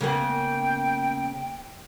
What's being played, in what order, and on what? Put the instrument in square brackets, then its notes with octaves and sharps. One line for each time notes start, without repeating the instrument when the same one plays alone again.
[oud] C#3 A#3 B3 [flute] G5